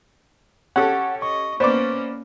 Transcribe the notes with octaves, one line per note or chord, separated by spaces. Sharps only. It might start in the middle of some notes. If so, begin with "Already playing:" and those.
C#4 G4 A4 F#5
D#5 C#6
A#3 B3 C#4 C5 D5 D6